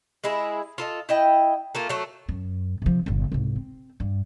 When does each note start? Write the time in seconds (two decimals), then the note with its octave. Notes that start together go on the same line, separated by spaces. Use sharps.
0.24 G#3 E4 G#4
0.78 F4 A4 D#5
1.09 E4 D#5 G5
1.75 A3 A#3 F4
1.89 F#3 A3
2.29 F#2
2.82 C3 F3
3.06 G1 A#2
3.32 C2 G#2
3.56 C4
4.00 G2